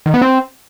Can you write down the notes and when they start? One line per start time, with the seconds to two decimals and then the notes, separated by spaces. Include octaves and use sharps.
0.06 D#3
0.14 B3
0.22 C4